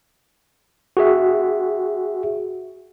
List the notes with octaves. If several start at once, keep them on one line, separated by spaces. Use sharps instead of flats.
F#4 G#4 E5